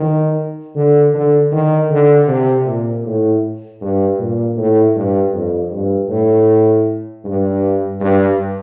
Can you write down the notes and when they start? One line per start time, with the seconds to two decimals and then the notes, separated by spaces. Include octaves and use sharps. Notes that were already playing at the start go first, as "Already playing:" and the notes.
Already playing: D#3
0.75 D3
1.14 D3
1.52 D#3
1.90 D3
2.28 C3
2.66 A#2
3.05 A2
3.81 G2
4.19 A#2
4.57 A2
4.95 G2
5.33 F2
5.72 G2
6.09 A2
7.25 G2
8.00 G2